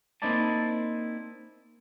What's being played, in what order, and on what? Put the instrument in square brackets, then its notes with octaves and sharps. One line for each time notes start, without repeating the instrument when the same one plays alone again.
[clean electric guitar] A#3 C4 D#4 E4 D5 A5